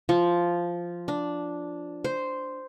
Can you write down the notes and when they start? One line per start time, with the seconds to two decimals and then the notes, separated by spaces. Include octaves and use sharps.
0.09 F3
1.08 D4
2.04 C5